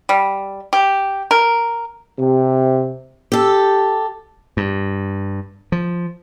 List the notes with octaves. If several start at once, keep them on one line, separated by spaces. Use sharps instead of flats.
G3
G4
A#4
C3
G4 A4
G2
F3